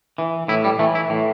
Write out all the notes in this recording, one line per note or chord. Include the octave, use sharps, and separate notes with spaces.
E3
A2 E4
G3
E3 A3
E4
A2